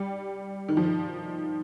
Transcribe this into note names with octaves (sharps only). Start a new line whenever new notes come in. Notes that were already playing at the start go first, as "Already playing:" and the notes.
Already playing: G3
D#3
F3
D#3